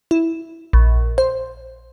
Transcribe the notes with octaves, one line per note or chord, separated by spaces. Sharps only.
E4
A#1
C5